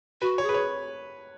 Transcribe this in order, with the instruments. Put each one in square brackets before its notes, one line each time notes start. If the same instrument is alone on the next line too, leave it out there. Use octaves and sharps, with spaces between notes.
[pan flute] F#4 [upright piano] B4
[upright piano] C#5
[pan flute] G#4
[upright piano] B4
C#5